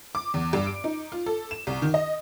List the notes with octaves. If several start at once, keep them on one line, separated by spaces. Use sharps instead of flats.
D6
E2
G2
D7
D#4
F4
A4
E7
C2
D#3
D#5